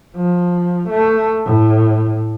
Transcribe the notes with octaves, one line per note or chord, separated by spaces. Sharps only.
F3
A3
A2